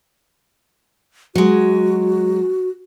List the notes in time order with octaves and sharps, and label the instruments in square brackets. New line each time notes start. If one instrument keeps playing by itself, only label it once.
[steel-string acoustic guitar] F#3 G#3 [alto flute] F#4